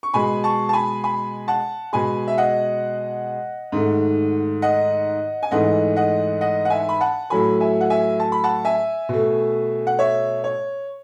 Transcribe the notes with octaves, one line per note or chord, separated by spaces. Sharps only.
C#6
B2 G#3 G#5 B5
A5 C#6
A5
G#5 B5
G#5 B5
F#5 A5
B2 G#3 G#5 B5
E5
D#5 F#5
G#2 D#3 A3
D#5 F#5
G#5
G#2 E3 A3 D#5 F#5
D#5 F#5
D#5 F#5
F#5
E5 G#5
B5
F#5 A5
A2 F#3 A3 G#5 B5
E5 G#5
F#5
E5 G#5
A5
B5
F#5 A5
E5 G#5
B2 A3
F#5
C#5 E5
C#5